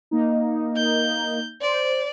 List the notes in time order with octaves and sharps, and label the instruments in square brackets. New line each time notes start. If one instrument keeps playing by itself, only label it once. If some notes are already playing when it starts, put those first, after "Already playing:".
[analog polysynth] A#3 D#4
[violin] G6
[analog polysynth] C5 [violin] D5